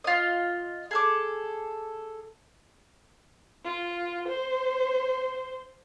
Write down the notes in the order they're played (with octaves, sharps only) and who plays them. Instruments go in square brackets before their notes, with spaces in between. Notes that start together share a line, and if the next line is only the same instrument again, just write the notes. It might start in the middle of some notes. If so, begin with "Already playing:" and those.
[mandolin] F4 D#5
G#4 A4 D6
[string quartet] F4
C5